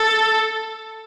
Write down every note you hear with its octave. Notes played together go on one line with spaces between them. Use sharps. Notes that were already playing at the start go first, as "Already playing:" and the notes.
Already playing: A4